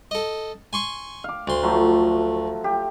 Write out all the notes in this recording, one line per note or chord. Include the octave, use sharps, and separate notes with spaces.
A4 D#5
G#5 C6 C#6
F5 D6
D2 C6
F3 F#3 A3
G4